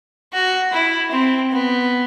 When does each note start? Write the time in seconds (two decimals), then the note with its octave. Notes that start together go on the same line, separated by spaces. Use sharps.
0.33 F#4
0.73 E4
1.11 C4
1.52 B3